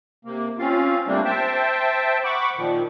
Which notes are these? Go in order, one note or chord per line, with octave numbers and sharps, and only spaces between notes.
C3 A#3
C4 C#4 F4 F5
C3 G3 A3 A#3 C4 D4
C5 E5 G5 A5
F#5 B5 C#6 D6
A#2 D#3 F3